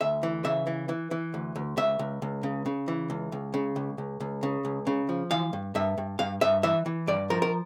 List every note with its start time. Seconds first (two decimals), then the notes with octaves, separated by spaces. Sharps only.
0.01 D2 E5
0.23 E3
0.45 C#3 E5
0.67 E3
0.89 E3
1.11 E3
1.34 D2
1.56 D2
1.77 C#2 E5
1.99 C#2
2.22 C#2
2.43 C#3
2.66 C#3
2.88 E3
3.10 C#2
3.32 C#2
3.54 C#3
3.76 C#2
3.98 C#2
4.20 C#2
4.43 C#3
4.65 C#2
4.87 C#3
5.09 F3
5.31 E3 F5
5.53 G2
5.75 G2 E5
5.98 G2
6.19 G2 F5
6.41 G2 E5
6.63 E3 E5
6.86 E3
7.07 G2 D5
7.30 F3 A#4
7.42 A#4